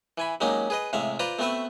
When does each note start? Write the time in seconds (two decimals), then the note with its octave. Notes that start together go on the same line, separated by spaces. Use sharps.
0.18 E3 G#5 B5
0.41 F#3 G#3 A#3 C#4 D#4 G4
0.70 G#4 B4 D#5
0.93 A1 C3 G#3 E5 F5
1.19 F4 B4 C5 D5 A#5
1.39 A3 B3 C4 F#4 B4 E5